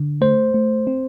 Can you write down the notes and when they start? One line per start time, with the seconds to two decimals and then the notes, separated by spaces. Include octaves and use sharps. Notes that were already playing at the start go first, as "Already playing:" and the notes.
Already playing: D3
0.21 A3 C5
0.54 A3
0.87 C4